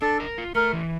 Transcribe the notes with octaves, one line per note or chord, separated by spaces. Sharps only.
D4 A4
A#4
F4
A3 A#4
E3